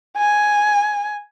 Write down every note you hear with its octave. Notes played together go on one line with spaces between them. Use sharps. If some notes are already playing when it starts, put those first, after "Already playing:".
G#5